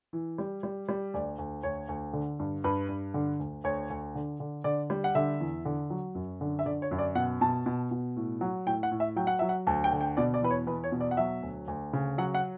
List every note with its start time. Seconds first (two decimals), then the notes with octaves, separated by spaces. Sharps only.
0.13 E3
0.38 G3
0.63 G3
0.89 G3
1.14 D2 D5
1.38 D2
1.63 D2 C#5
1.89 D2
2.13 D3
2.39 G2
2.64 G2 B4
2.89 G2
3.14 D3
3.40 D2
3.64 D2 C#5
3.90 D2
4.15 D3
4.40 D3
4.64 D3 D5
4.90 G3
5.04 F#5
5.15 D3 E5
5.40 E2
5.65 D3
5.90 F#3
6.15 F#2
6.41 D3
6.59 E5
6.66 D3 D5
6.82 C#5
6.91 F#2
6.99 D5
7.15 B2 F#5
7.41 B2 A5
7.66 B2
7.91 B2
8.16 A2
8.41 F#3
8.66 A2 G5
8.83 F#5
8.91 A2
9.00 E5
9.16 F#3 G5
9.27 F#5
9.39 F#3 E5
9.49 F#5
9.67 D2 A5
9.84 G5
9.92 D3
10.01 G5
10.17 B2 D5
10.34 D5
10.42 E2 B4
10.50 C#5
10.67 E2 B4
10.84 C#5
10.92 B2
11.01 D5
11.11 F#5
11.17 F#3 E5
11.42 D2
11.68 D2
11.93 C#3
12.18 F#3 F#5
12.35 F#5